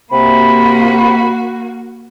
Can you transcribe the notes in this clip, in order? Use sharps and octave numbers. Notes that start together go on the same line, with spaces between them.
C3 A#3 F#4 B5